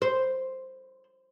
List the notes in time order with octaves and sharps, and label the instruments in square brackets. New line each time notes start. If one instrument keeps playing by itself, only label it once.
[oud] C5